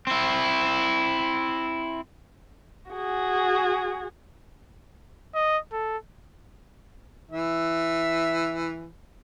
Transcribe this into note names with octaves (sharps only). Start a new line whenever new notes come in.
C4 E4
F#4 G#4
D#5
A4
E3 E5